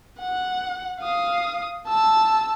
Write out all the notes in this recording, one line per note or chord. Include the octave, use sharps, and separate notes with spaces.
F#5
F5 D#6
A5 E6